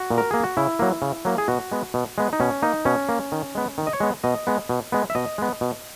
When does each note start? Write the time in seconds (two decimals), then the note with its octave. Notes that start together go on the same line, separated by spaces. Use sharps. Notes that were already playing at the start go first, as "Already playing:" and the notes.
Already playing: F#4
0.10 A#2
0.18 A#4
0.31 A#3 G#4
0.44 F#4
0.57 C#3 E4
0.79 F#3 A#3
1.02 C#3
1.25 F#3 A#3
1.38 G#4
1.48 B2 F#4
1.72 G#3 B3
1.94 B2
2.18 G#3 B3
2.33 D#4
2.40 B2 C#4
2.62 A#3 D#4
2.85 B2 C#4
3.09 A#3
3.32 D#3
3.55 G#3 B3
3.78 D#3
3.87 D#5
3.93 C#5
4.00 G#3 B3
4.24 B2 D#5
4.47 G#3 B3
4.69 B2
4.92 G#3 B3
5.10 E5
5.15 B2 D#5
5.38 G#3 B3
5.61 B2